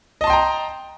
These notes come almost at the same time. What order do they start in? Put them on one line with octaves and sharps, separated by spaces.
D#5 A5 C6 G5 A#5